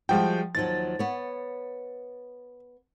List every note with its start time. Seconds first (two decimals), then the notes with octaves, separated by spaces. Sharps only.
0.09 F3 G3 G#3 F#4 G5
0.55 D#2 F3 F#3 A6
0.99 B3 C#5